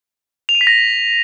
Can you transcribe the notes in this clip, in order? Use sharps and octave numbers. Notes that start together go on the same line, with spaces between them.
F7
D#7
B6
A#6